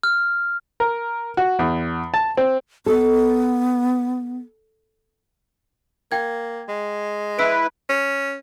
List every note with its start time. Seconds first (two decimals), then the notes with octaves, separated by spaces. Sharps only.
0.03 F6
0.80 A#4
1.37 F#4
1.59 E2
2.14 A5
2.37 C4
2.86 B3 A4
6.12 A#3 G5 G#6
6.68 G#3
7.39 E4 B4 E6 B6 D7
7.89 C#4